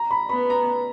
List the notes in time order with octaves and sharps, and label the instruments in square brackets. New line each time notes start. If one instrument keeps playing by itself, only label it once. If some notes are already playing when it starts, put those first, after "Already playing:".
Already playing: [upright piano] A#5
B5
[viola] B3 [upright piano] B5
[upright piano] A#5